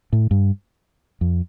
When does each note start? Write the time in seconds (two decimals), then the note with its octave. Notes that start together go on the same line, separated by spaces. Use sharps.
0.13 A2
0.31 G2
1.21 F2